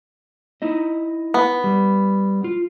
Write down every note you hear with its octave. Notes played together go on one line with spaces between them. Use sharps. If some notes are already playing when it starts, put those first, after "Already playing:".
D#4 E4 D#5
B3
G3
F4